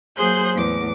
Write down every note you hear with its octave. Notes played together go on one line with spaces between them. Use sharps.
F#3 A#3 G#4 C5 F#6 G6
E2 A2 D6